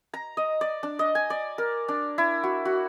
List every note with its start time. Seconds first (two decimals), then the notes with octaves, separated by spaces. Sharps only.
0.14 A#5
0.37 D#5
0.61 D5
0.83 D4
0.99 D#5
1.15 G#5
1.30 D5
1.58 A#4
1.88 D4
2.18 E4
2.44 F#4
2.65 F#4